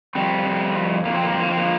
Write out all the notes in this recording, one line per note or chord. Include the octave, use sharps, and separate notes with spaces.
F2 G3 C4
F2
F2
F2 A#3
C4
A#3
F2 C4
A#3
C4
F3 A#3